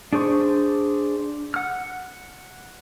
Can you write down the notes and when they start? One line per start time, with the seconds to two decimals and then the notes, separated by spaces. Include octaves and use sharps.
0.13 D4 G#4 C5 C#6
1.54 F#5 F6